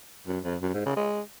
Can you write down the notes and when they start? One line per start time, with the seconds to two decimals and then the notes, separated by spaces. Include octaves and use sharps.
0.27 F#2
0.44 F2
0.62 F#2
0.74 G#2
0.86 C#3
0.96 G#3